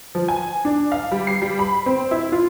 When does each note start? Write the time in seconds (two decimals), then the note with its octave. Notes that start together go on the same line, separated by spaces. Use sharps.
0.15 F3
0.28 G#5
0.65 D4
0.92 F5
1.11 G3
1.27 C7
1.42 G3
1.59 B5
1.86 C4
2.11 E4
2.32 F4